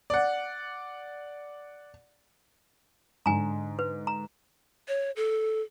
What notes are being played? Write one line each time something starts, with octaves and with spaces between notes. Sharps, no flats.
D5 F#5
G#2 D3 G#5 A#5
B4
A#5
C#5
A4